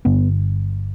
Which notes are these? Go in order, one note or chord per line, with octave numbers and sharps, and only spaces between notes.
G1 G2 D3 B3